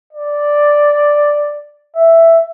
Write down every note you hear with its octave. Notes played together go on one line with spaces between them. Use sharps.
D5
E5